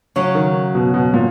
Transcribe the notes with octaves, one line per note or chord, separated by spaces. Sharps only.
C#3 F#3 C#4
D#3
B2
B2
A#2